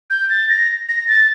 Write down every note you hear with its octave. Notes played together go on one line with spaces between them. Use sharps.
G6
A6
A#6
A#6
A6